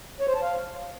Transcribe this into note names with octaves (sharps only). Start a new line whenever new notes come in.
C#5
C5
A5
F5